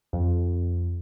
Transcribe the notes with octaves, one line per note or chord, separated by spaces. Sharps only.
F2